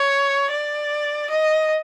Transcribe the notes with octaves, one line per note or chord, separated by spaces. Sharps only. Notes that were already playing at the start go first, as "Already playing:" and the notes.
Already playing: C#5
D5
D#5